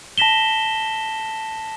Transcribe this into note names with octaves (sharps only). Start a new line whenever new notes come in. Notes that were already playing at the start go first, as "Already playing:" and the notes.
A5 A#6 B6 E7 G7